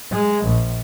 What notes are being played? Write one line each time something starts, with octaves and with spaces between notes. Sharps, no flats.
G#3
A#1